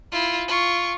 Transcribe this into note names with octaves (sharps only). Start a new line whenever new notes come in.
E4 F4
F4 C#6